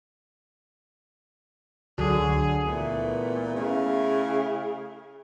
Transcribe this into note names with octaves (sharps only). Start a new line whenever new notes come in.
C#2 D3 F#3 F#4 G#4
A#2 E3 A3 B3
C#3 A3 E4 G#4 F5